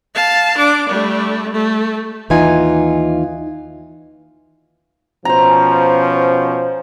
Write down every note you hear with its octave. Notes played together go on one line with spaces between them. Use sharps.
F5 A5
D4 D6
G3 A3
A3
D#2 E3 D#4 F4 G#5
B2 F3 C#4 C5 A#5